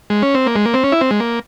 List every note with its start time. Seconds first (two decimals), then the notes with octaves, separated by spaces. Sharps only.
0.10 G#3
0.22 C#4
0.34 C4
0.46 A#3
0.56 G#3
0.65 A#3
0.74 C4
0.84 C#4
0.92 E4
1.01 C4
1.11 G#3
1.20 A#3